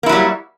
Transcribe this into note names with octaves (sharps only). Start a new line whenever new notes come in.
F#3 G3 A#3 E4